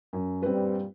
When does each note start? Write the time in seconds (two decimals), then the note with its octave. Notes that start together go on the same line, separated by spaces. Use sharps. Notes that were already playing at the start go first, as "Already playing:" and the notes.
0.13 F#2
0.43 G2 A#2 G3 C4 B4